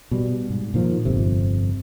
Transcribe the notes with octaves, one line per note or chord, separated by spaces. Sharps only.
B2 G3
G#2
A#2 D#3 F3
G1 F2 C3